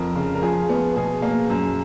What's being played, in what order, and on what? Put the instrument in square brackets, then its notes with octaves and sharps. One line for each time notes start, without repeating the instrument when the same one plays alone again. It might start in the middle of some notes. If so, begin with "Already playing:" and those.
Already playing: [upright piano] F2 A#4
C#3
A#4
F3 G#4
B3
B2 G#4
A#3
F#2